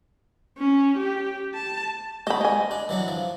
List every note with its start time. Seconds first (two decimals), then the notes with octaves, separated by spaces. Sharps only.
0.58 C#4
0.97 G4
1.54 A5
2.27 G#3 D#5 B5
2.41 D#5 G#5
2.71 D4
2.89 E3 F#3 D4
3.08 F3